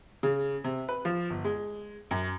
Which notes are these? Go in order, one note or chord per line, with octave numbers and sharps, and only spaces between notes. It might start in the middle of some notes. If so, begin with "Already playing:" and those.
C#3
C3
B4
F3
G1
G#3
F#2